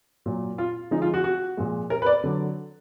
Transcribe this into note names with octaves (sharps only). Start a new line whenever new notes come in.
A#2 F#3
F4
D3 F3 G#3 D#4
F4
F#4
F#4
A#2 F3 G#3
A#4
B4
D5
D3 F#3